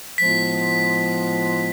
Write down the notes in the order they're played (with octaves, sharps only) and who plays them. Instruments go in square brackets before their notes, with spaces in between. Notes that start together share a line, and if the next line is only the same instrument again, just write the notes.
[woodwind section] A2 F3 G#3 B3 F4 [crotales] B6